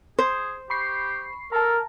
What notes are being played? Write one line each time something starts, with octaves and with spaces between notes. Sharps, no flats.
G#4 C5
G4 B5 C#6 C7
A4 A#4 A5 A#5